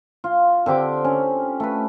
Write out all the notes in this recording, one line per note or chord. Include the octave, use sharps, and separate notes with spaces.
F4
D3 C4 G4 D6
C#4
A3 B4